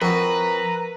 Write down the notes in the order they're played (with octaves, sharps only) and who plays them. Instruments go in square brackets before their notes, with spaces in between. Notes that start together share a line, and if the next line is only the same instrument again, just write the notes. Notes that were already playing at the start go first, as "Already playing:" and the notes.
[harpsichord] F2 F#4 [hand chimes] A#4 [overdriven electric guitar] B4 [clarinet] A#5